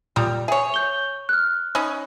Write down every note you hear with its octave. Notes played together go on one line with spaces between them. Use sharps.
A#2 G3 A#5 D#6
G#4 C#5 E5 G#5
G6 G7
F6 F#6
C#4 D#4 B5 D#6